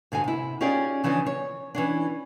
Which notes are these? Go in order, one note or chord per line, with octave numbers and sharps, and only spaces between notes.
G#2 D3 F#4 G#5
C3 E4
C#4 D#4 F4 G4 G#4 D5
C#3 E3 F3 C#4 D4
C#5
E3 C#4 D4